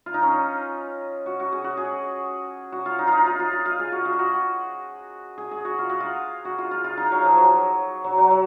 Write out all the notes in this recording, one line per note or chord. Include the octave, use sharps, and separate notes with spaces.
F4
D#4
C#4
D#4
F#4
F#4
G#4
F#4
G#4
F#4
F4
D#4
F4
D#4
F4
F4
F4
F4
G#4
F#4
F#4
F4
F#4
G#4
G#4
F#4
F4
F#4
F4
F#4
F4
F4
F4
D#4
F#3
F3
F#3
F#3
F#3
F#3